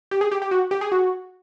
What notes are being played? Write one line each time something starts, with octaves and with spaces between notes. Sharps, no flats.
G4
G#4
G4
G4
F#4
G4
G#4
F#4